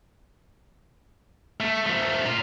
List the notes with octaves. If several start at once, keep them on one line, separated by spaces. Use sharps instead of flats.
A3
F3 A3
A#2 F4